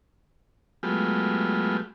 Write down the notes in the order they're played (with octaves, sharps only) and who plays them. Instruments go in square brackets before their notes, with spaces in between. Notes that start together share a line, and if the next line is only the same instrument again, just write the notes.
[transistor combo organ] F#3 G#3 A3 B3 F4 G4